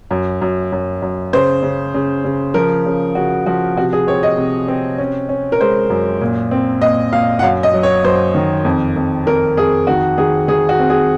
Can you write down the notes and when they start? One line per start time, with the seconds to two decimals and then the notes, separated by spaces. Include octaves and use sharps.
0.11 F#2
0.41 F#2
0.72 F#2
1.02 F#2
1.33 C#3 C5
1.63 C#3
1.94 C#3
2.25 C#3
2.54 F3 A#4
2.86 C#3
3.15 C#3 F#4
3.46 F3 F#4
3.77 C3 F#4
3.93 G#4
4.07 C4 C#5
4.23 D#5
4.37 C3
4.68 C4
4.98 C#4
5.29 C#4
5.52 A#4
5.61 G#3 C5
5.90 F#2
6.21 A#2
6.51 C4
6.82 A#2 D#5
7.12 A#2 F5
7.39 F#5
7.43 F#2 F5
7.63 D#5
7.73 F#3
7.83 C#5
8.04 F#2 C5
8.35 D#3
8.65 F2
8.96 F2
9.26 F2 A#4
9.57 F2 G#4
9.87 D#3 F#4
10.18 D#3 G#4
10.48 D#3 G#4
10.69 F#4
10.79 C4
10.90 G#4